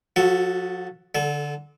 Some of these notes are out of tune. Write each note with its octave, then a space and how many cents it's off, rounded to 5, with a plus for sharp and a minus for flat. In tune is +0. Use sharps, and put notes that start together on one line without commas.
F3 +40 F#4 +0 A4 +0
D3 +0 A4 -30